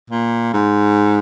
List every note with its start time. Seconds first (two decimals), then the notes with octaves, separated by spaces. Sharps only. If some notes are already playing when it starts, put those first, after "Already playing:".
0.10 A#2
0.53 G#2